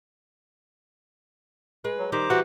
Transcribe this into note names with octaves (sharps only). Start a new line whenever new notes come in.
G#3 B4
F#3
D#3 G3 C5 A#5 D6
E3 G3 F#4 F#5